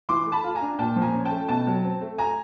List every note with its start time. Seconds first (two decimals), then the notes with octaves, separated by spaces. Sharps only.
0.09 E3 C6 D6
0.26 A3
0.32 A5 B5
0.44 F4
0.55 G#5 A#5
0.61 D4
0.79 A#2 G5 A5
0.96 F3
1.02 G#5 A#5
1.13 C#4
1.25 G5 A5
1.31 A3
1.48 B2 G5 A5
1.67 F#3
1.84 C4
2.01 A3
2.18 G#5 A#5